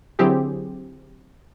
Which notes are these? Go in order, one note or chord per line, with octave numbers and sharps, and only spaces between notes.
D3 F#3 C4 E4 G4 G#4